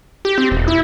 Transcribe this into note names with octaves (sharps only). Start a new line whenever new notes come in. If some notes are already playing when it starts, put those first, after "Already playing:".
G4
C4
E1
E4